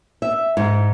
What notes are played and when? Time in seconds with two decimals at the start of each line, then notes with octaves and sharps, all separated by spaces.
0.22 E5
0.57 G#2